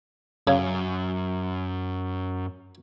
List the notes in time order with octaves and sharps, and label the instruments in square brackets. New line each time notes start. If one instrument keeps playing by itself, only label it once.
[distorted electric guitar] F#2 [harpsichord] C#3